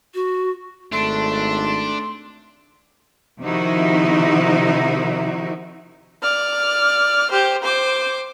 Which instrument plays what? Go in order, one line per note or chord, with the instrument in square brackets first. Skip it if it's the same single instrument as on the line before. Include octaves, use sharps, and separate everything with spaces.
[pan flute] F#4
[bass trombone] G#1 [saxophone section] A3 [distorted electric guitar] D4 [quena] C6
[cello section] C3 D#3 F3 D#4 E4 F#4
[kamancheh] D5 F6
G4 C5
C5 D6